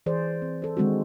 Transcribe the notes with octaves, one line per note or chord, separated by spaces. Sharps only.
E3 G#4 C5 D5
C4
A4 C5
D#3 G#3 C4 D4 F#4